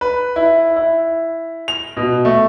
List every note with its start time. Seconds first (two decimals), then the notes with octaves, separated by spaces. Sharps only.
0.01 B4
0.36 E4
0.76 E4
1.68 F7
1.97 B2
2.25 A3